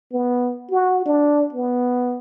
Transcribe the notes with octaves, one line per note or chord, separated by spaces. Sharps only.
B3
F#4
D4
B3